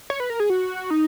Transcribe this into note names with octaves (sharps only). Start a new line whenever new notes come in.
C#5
B4
A#4
G#4
F#4
D#4